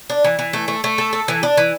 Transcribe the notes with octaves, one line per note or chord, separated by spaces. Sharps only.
D4
E3
E3
A3
A3
A3
A4
A4
E3
D4
E3